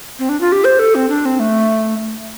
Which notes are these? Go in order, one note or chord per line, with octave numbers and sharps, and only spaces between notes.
C4
D4
F4
G4
C5
A4
C4
D4
C4
A3